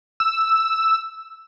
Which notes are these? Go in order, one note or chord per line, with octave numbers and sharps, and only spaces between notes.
E6